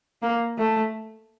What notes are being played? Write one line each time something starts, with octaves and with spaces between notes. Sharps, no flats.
A#3
A3